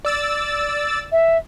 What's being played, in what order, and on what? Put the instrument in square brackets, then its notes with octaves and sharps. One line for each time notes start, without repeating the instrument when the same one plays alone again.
[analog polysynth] D5 E6 A6
[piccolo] E5